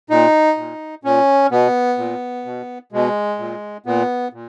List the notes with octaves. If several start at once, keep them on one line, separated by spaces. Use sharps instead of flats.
A#2 D#4
A#2
A#2 C#4
B2 B3
A#2
B2
B2 G#3
A#2
A#2 B3
A#2